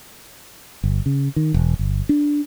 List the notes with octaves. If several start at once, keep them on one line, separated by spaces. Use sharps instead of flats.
G1
C#3
D#3
E1
G1
D4